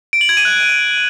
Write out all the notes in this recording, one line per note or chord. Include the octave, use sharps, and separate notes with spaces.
D7
F#7
G#6
D#7
F#6